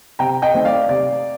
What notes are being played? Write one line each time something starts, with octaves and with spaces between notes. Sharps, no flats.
C3 G5 A#5
D#5 G5
D#3 A3 C4
D5 F5
C3 D5